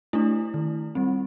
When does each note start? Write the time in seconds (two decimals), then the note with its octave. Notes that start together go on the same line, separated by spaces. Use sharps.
0.13 A3 D4 E4
0.54 D#3
0.95 G3 C4